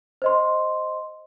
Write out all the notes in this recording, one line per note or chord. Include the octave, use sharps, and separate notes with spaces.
C5 D#5 C6